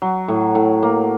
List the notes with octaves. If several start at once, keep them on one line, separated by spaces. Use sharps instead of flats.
F#3
A2
A2
A#3